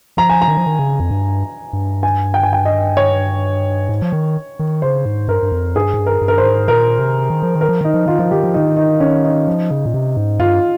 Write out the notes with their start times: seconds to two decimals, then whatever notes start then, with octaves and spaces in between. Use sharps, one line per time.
0.17 F3 A#5
0.30 G#5
0.42 A#5
0.48 D#3
0.57 F3
0.66 D#3
0.79 C#3
1.00 F2
1.11 G2
1.73 G2
2.03 G#5
2.34 G5
2.43 G#5
2.53 G5
2.65 D#5
2.97 C#5
3.89 G#2
4.02 F3
4.12 D#3
4.59 D#3
4.82 C#3 C5
5.05 G#2
5.28 G2 A#4
5.43 G2
5.52 F2
5.76 G2 G#4
5.94 G#2
5.99 G2
6.06 A#4
6.21 G2
6.28 A#4
6.38 C5
6.45 G#2
6.68 A#2 A#4
6.99 C3
7.30 D#3
7.42 F3
7.55 D#3
7.61 A#4
7.69 F3
7.81 D#3 D#4
7.94 F3
8.06 D#3 F4
8.19 F3 F4
8.31 D#3 G4
8.44 F3
8.54 D#3 D#4
8.77 D#4
9.00 C#4
9.24 D#4
9.47 F3
9.71 C#3
9.86 A#2
9.94 C3
10.17 G#2
10.39 G2 F4